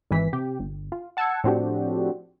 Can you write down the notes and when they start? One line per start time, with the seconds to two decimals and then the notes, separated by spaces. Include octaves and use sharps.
0.11 G#1 G#2 E3 B6
0.33 C3 G4
0.59 G1
0.92 F4
1.17 F#5 A5 E6 F#6 G#6 C#7
1.44 A2 F3 C4 D4 F#4 G4